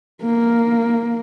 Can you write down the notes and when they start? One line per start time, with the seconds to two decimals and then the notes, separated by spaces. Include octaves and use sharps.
0.23 A#3